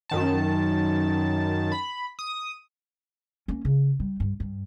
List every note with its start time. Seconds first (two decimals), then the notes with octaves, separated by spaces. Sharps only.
0.09 F#2 D#3 A5
1.72 B5
2.19 D#6
3.48 A#3 C#4
3.65 C#3
4.00 G3
4.20 G2
4.40 G2